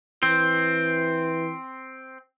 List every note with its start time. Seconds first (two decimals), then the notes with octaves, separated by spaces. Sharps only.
0.23 E3 C4